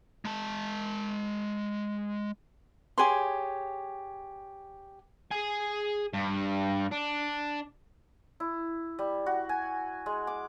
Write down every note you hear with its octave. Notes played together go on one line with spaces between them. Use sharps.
G#3 A5
G4 G#4 C#5 C6
G#4 G#5
G2
D4
E4
G3
F#4
G#5
G#3
D6